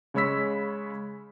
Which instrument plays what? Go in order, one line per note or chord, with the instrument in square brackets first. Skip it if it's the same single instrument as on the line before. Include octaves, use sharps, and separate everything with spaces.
[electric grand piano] C#3 G#3 C#5 B5 E6 B6